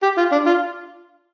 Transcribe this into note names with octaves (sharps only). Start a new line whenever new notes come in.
G4
F4
D4
F4